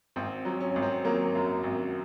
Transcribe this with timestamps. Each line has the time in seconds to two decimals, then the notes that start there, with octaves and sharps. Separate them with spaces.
0.16 G#1 C4
0.45 F#3
0.60 C#4
0.76 G#1
0.82 C4
1.05 F#3 A#3
1.35 F#2
1.64 G#1